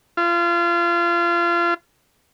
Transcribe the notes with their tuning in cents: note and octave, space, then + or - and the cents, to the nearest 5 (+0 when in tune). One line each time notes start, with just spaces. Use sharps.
F4 -30